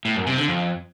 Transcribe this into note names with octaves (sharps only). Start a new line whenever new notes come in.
A2
F#2
C3
D3
F2